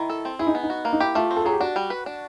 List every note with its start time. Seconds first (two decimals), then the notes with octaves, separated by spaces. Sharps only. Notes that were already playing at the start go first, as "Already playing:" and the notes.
Already playing: D#3 E4
0.10 A4
0.25 C4
0.39 E4 G#4
0.47 D#4
0.55 B3
0.63 D#4
0.70 F#4
0.85 A#3
0.93 D#4
1.00 E4 G4
1.15 A3 F4
1.31 C4
1.37 A4
1.45 F#3 G#4
1.53 G4
1.60 D4 F#4
1.76 G3
1.90 B4
2.06 D4